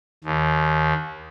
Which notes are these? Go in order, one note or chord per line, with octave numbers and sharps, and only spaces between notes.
D#2